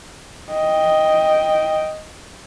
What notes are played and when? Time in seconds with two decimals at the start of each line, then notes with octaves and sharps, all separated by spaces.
0.51 D#5 G5